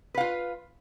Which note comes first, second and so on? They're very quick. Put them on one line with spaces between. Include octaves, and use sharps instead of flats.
B4 F5 F4